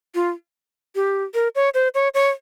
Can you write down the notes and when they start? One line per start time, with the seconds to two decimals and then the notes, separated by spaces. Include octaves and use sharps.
0.15 F4
0.95 G4
1.34 A#4
1.55 C#5
1.74 C5
1.95 C#5
2.14 C#5